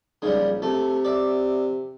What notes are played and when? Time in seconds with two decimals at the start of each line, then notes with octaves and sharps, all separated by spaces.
0.22 G#2 C#3 G3
0.36 A#1
0.62 C3 A3
1.05 D5 E5